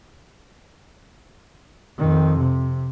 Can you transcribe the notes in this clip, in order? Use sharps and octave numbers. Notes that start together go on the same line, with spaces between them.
F2 D#3
C3